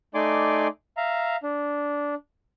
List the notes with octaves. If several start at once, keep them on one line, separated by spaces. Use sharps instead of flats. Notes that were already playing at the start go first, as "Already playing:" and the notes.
A3 D#4 D5 G#5 C6 D6
E5 F5 A#5
D4